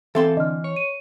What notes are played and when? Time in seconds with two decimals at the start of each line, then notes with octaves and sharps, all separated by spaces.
0.15 E3 C4 A4 E5 F5 C6
0.37 D3 D#5 F6
0.64 C#5
0.76 D#7